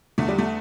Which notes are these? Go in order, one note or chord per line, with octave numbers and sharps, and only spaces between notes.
E2 D3 A3
G3
A3